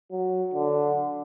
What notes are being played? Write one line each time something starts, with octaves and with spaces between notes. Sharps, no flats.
F#3
D3